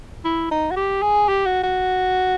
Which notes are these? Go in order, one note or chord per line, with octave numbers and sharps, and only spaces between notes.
E4
D#4
F#4
G4
G#4
G4
F#4
F#4